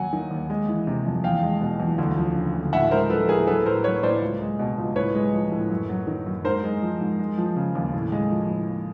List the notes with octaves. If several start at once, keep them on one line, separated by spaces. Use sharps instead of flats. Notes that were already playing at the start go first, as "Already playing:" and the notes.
Already playing: D#2 F#3 F#5 G#5
D#3
D#2
G#3
E3
C3
F2
E2 F5 G5
G#3
B2
E2
D2
F3
C#3
D2
A2 E5 F#5
G#3 A#4 C5
F3 A4 B4
A2 G#4 A#4
F#3 A4 B4
A2 A#4 C5
F#3 B4 C#5
A2 C5 D5
C#2
G#3
B2
C#2
A2 B4 C#5
G#3
F3
A2
F#2
F#3
D#3
F#2
G#2 A#4 C5
G#3
F3
G#2
G#3
F3
C#3
D#2
A2
G#3
F3
A2